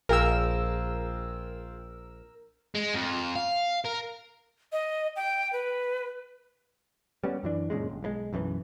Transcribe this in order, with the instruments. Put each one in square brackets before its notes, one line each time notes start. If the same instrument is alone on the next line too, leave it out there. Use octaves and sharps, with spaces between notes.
[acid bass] A#1 [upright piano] F4 G#4 G5 [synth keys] A#4 E6
[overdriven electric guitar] G#3
F2
F5
A#4
[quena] D#5
G5
B4
[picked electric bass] G3 B3 C#4
F#2 E3 D4
F#2 A#2 C#3 G#3
G1
B1 E3 G#3
B1 F#2 D#3 E3